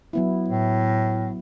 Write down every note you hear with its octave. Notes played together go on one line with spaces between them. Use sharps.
F#3 B3 E4
A2